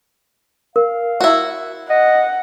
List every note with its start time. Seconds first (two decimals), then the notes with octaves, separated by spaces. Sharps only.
0.76 A#4 F5
1.20 E4 F#4
1.90 D#5 F#5